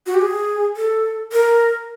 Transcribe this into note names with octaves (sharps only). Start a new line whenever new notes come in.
F#4
G4
G#4
A4
A#4